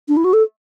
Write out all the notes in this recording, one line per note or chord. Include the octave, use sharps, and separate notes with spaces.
D4
E4
F#4
A4